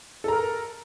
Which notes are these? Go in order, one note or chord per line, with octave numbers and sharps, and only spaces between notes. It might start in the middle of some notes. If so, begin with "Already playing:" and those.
A4 A#4 A#5